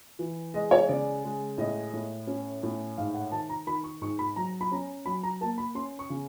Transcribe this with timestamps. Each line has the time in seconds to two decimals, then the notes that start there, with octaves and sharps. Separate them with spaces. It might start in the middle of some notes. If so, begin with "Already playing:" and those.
0.19 E3
0.54 G#3 D#5
0.71 C#5
0.89 C#3 D5
1.24 G#3
1.58 A2 D#5
1.93 A2
2.27 C#4
2.63 A2
2.97 G#2 F5
3.14 F#5
3.32 D#3 A5
3.49 A#5
3.67 D#3 B5
3.84 C#6
4.01 G#2 C#6
4.19 B5
4.36 F#3 A#5
4.61 B5
4.71 C#4 A#5
5.06 F#3 B5
5.23 A#5
5.41 A#3 A5
5.58 B5
5.75 C#4 C6
5.99 C#6
6.10 C#3